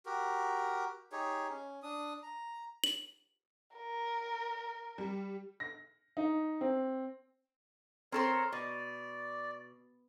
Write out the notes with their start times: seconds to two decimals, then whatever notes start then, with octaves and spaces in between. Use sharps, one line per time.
0.06 F#4 G4 A#4
1.12 D#4 G4 G#4 C#5
1.50 C#4
1.83 D4 D#6
2.23 A#5
2.84 F#7
3.77 A#4
4.98 G3
5.60 A#6
6.17 D#4
6.61 C4
8.12 C4 A4 A#4 C5 C#5
8.52 B2 D5